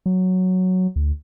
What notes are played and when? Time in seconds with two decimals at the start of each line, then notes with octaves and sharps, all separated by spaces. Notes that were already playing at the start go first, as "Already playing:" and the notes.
0.06 F#3
0.96 D2